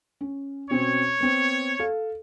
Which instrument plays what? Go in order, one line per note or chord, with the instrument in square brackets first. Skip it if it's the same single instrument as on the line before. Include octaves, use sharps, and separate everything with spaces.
[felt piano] C#4
[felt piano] B2 C4 C#4 [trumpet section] C#5
[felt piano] B3 C4
A4 F5